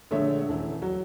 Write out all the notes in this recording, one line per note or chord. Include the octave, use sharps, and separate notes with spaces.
A#1 D3 G#3 A3 C#5 E5
D#1 E3 E4
F#3 F#4